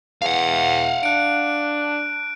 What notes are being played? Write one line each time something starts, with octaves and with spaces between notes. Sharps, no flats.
E2 F5 F#5
D4 F#6 D7